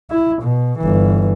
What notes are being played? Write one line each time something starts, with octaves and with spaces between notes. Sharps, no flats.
E4
B2
G1 E3